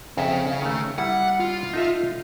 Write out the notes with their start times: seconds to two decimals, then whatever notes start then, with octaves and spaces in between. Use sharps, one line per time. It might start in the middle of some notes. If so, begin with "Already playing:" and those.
0.17 F2 C#3 E5
0.62 D#3 A3
0.98 G3 E4 F#5
1.40 F4
1.74 D#4 A4 E5